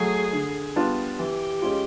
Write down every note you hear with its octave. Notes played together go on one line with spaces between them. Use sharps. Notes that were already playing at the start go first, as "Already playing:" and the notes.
Already playing: F#3 A3 G#4
D3
G3 B3 D4 F4
E3 G4
G#3 C#4 F4